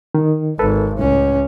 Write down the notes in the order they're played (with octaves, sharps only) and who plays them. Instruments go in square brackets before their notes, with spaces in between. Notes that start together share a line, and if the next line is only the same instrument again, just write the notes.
[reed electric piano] D#3
[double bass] G#1 [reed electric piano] A4 B4
[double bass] C#2 C#4 [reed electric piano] A2